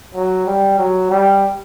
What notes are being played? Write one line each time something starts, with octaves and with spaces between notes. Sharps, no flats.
F#3
G3
F#3
G3